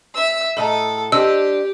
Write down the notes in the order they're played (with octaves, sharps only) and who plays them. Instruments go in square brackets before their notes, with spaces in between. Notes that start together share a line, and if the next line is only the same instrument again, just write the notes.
[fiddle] E5 E6
[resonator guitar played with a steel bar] A2 D#5 A#5 [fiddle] A4
[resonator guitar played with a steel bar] D4 C5 D#5 [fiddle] G4 [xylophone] E6